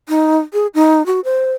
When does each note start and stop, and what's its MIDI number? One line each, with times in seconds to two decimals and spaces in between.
0.09 0.37 63
0.53 0.67 68
0.74 1.05 63
1.06 1.20 66
1.24 1.53 72